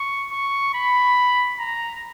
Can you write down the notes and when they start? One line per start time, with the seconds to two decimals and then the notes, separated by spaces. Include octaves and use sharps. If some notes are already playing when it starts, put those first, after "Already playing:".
Already playing: C#6
0.31 C#6
0.74 B5
1.59 A#5